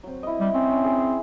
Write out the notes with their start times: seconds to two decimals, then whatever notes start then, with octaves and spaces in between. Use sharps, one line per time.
0.03 F#3 C4
0.23 E4 D#5
0.40 G3
0.54 C4 C#4
0.72 C#4
0.84 G#4 D5